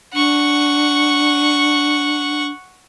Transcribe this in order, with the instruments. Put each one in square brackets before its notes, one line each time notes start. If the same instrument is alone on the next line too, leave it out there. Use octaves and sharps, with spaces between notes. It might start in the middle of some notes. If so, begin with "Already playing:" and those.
[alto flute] D4 [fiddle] F#5 C#6